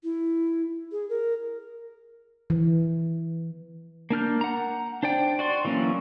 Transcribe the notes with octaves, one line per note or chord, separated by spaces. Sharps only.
E4
G#4
A#4
E3
A#3 D4 F6 G6
F#5 A#5
D4 C5 D5 G5
F#4 D5 C6
E3 F#3 A#3 C#4